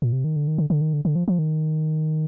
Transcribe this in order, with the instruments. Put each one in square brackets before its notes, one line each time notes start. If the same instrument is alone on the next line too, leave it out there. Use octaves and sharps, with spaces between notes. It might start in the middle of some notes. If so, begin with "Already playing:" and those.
[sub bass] A#2
C3
D#3
D3
D#3
D3
D3
D#3
D3
D3
F3
F3
D#3